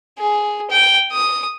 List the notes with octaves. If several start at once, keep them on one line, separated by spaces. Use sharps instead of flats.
G#4
G5
D#6